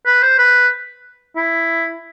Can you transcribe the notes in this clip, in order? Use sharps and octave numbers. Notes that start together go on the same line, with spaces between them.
B4
C5
B4
E4